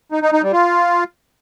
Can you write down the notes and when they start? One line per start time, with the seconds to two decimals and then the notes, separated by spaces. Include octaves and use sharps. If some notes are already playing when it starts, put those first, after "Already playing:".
0.12 D#4
0.22 D#4
0.32 D#4
0.43 G3
0.53 F4